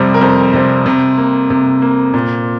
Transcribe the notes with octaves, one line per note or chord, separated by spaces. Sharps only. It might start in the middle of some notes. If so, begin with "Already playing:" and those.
Already playing: F2 C3 G3 C4
A#4
F2 C5
C3 G3 C4
C3
A#3
C3
A#3
A#2